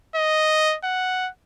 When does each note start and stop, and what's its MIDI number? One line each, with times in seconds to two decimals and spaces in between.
0.16 0.76 75
0.84 1.29 78